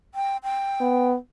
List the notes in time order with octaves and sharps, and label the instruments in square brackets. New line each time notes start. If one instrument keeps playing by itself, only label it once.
[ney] G5
G5
[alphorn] B3